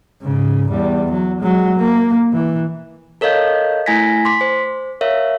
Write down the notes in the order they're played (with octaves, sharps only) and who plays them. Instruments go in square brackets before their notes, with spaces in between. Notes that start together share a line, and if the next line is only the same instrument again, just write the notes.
[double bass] G#2 C#3
E2 G3
F#3
F#3 G#3
A#3
E3
[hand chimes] A4 A#4 C#5 D#5 F5 G6
A3 E4 G#5 G#6 A#6 B6
C6 D6 B6
C5
A#4 C#5 E5 F5